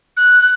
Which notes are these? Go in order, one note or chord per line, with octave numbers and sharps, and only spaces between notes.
F#6